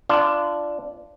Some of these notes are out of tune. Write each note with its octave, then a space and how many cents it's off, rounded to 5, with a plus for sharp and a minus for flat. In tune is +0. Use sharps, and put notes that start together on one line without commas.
D4 +0 F4 -25